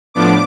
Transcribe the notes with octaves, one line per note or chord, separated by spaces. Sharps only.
A2 F3 B3 D4 D6